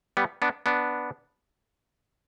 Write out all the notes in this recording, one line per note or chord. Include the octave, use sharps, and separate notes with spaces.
G3 B3
B3 D4
B3 D4